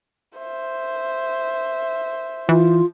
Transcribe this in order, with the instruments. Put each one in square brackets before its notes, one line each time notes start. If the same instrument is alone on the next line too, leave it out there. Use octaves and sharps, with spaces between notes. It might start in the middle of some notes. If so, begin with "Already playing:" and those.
[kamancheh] C5 E5
[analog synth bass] E3 [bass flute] F4